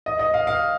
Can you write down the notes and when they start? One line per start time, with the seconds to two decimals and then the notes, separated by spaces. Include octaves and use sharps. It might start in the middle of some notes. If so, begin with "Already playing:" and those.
0.06 D#5
0.19 D#5
0.34 F5
0.47 F5